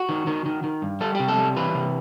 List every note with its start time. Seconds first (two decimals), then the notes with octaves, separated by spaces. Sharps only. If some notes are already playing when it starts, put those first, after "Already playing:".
Already playing: F#4
0.09 D#3
0.27 D#3
0.46 D#3
0.64 D#3
0.82 G2
1.01 G3 A4
1.15 C3 G4
1.28 A4
1.38 G3
1.56 E3 B4
1.74 C3